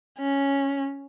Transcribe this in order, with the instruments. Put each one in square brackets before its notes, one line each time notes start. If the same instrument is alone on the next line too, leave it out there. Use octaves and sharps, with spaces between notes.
[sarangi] C#4